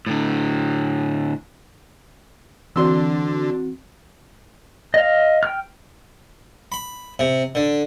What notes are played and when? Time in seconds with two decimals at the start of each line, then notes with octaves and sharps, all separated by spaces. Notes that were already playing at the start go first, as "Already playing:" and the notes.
0.07 A2 D3
2.76 D3 E3 C4 D4 F#4 C6 E6
4.94 D#5 F5
5.43 G5 F6
6.72 B5
7.19 C3
7.55 D3